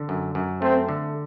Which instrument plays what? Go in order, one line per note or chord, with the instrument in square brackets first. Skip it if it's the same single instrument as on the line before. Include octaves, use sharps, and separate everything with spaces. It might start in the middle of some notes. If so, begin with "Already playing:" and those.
Already playing: [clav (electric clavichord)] D3
F#2
F#2
[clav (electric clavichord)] A3 [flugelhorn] C4
[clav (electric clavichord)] D3